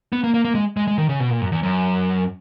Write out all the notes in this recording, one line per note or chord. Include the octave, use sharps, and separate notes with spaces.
B3
A#3
A#3
A#3
G#3
G#3
G#3
D#3
C#3
B2
A#2
F#2
E2
F#2